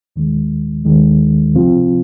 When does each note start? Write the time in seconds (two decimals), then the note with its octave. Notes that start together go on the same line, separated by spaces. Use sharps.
0.16 D#2 D#3 G#3
0.85 D#2 D#3 G#3
1.54 C2 C3 F3 C4 F4